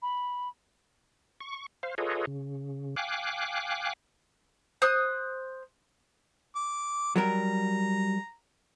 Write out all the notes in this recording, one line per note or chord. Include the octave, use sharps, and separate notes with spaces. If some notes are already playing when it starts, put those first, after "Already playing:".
B5
C#6
C5 F5
F4 G#4 A4 B4 C#5 D#5
C#3
F5 G5 G#5 D6 F#6
C5 D#6 F#6
D6
F#3 G3 A#4 A#5